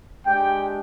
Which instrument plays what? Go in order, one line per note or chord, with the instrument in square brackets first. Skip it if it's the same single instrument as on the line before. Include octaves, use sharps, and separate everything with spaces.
[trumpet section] G#3 D4 G4 G5